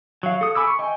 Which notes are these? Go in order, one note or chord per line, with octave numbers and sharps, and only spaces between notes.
F#3 F5
A4 D#6
A4 G#5 B5 D6 E6
C#6
D#5 G5 G#5